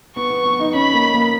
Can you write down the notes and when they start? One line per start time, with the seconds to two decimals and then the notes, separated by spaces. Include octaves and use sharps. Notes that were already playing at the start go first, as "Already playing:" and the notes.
0.16 B3 C#6
0.30 B3
0.45 B3
0.60 D#4
0.74 C#4 B5
0.94 A#3
1.14 A#3